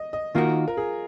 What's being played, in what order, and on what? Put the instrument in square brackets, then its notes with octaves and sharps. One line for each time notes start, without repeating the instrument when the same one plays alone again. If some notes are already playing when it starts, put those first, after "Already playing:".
Already playing: [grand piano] D#5
D#5
[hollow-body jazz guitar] D#3 A#3 D#4 F#4 A#4 [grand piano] F4
[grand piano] A#4
G#4